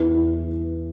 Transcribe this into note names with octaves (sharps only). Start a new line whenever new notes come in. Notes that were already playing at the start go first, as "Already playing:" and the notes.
Already playing: E2 E3 B3 E4